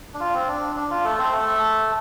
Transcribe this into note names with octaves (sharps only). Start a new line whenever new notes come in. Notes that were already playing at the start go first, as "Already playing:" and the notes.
D4
F4
C4
D4
D4
F4
A3 A4
C4 C5
A3 A4